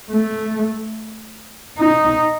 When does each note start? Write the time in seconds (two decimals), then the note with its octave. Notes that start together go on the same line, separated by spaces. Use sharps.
0.11 A3
1.78 D#4